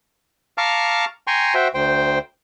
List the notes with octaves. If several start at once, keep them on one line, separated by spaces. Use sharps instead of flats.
F5 A5 A#5 C#6 D6 F6
G5 G#5 A#5 C6 C#6
F#4 C5 E5 G5
D2 C5 G5